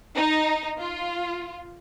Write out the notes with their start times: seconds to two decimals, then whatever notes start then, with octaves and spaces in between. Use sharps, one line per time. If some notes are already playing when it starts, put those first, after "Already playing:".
0.16 D#4
0.79 F4